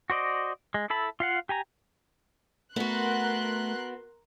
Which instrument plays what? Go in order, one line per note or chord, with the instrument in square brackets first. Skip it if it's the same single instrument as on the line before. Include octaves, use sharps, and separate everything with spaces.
[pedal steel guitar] F#4 C5 D5 D#5
G#3
E4 A4 A5 B5
F4 F5 F#5
G4 G#5 A#5
[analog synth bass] A3 [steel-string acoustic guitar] B3 F#4 [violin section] A#4 C6 F#6